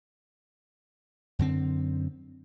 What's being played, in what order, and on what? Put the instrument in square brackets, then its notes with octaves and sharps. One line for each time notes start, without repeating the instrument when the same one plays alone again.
[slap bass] F#2 D3 C4